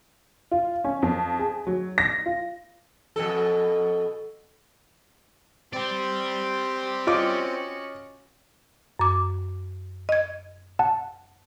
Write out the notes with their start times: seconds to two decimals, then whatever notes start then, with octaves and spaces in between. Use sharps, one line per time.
0.51 F4
0.84 C#4
1.02 F2
1.39 G#4
1.67 F#3
1.98 A#6
2.26 F4
3.16 F2 B2 A4
5.73 C4 G4 D5 C6
7.07 C#4 F4 F#4 D#5 D6
8.99 F#2 D6
10.09 D#5 G#6
10.79 F#5 A5